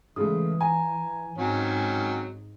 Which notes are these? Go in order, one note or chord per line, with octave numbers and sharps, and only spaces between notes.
C#3 E3 G#3 A3 D#6
G#5 A#5
G#2 D#3 F#3 C4 C#4